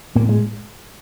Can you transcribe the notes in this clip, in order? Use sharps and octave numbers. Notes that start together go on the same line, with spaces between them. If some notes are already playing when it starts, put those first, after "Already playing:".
A2 A#3
G#3